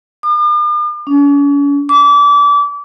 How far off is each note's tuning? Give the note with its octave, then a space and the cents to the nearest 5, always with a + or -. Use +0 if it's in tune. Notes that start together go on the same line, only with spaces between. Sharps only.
D6 +45
C#4 +40
D6 -30